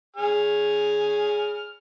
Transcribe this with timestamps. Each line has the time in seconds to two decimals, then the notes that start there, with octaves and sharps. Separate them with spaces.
0.16 G#4 G#5 F6